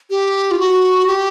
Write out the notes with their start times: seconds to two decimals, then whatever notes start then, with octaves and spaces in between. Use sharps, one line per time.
0.10 G4
0.51 F4
0.59 F#4
1.07 G4